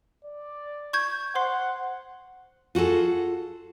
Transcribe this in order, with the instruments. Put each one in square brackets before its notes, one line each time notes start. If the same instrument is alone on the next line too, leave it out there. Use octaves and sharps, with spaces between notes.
[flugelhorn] D5
[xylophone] C#6 G6 G#6
[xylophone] C5 C6 C7 [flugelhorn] F#5
[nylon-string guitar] F4 F#4 G#4 A4